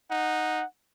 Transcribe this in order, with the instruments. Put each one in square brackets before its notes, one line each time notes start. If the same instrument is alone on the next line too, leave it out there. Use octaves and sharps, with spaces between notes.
[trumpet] D#4 [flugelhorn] F#5